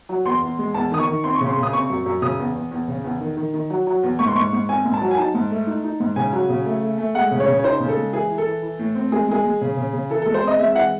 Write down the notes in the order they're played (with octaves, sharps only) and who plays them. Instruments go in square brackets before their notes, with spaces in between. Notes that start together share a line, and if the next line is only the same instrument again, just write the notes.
[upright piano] F#3
E2 C6
E2
G#3
E2 A5
D#3 D#6
C#6
D#3
C4 C6
C#6
C#3
C6
C#3
D#6
C4 C#6
F#2
F#2
C#3 D#6
E2
E2
E2
C#3
E2
D#3
D#3
D#3
F#3
F#3
E2
G#2 C#6
C6
G#2 C#6
G#2
C4 G#5
G#2
A5
F#3
G#5
D#4 A5
G#2
A3
D#4
D#4
G#2
C#3 G#5
F#3
C#3
A3
A3
A3
G#3 F#5
C#3
C#5
C#3
C#5
D#4 C5
C#3
A4
G#3
E3 G#4
E3
A4
E3
E3
A2
C4
G#3 G#4
G#3 G#4
G#3
C#3
C#3
C#3
E3 A4
G#3 A4
C5
C4 D#5
G#3 E5
E5
E3 F#5